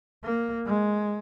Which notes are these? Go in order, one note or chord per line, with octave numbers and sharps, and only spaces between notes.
A#3
G#3